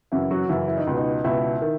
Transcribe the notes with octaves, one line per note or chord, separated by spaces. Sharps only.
F#2 C#3 E3 E4
F#3 F#4
F#2 C#3 E3 E4
E4
D#4
C#2 B2
D#4
C#2 B2 E4
D#3